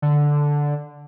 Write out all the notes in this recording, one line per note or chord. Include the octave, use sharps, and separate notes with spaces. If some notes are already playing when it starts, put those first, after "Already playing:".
D3